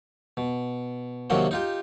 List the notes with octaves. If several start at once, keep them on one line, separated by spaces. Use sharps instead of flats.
B2
C3 D#3 F#3 A#3 D4 F#4
D#4 F4 G4